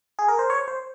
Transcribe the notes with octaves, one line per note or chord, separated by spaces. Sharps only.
G#4
A#4
C5
C#5
C5